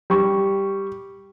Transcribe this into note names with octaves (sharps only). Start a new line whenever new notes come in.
G3 C#6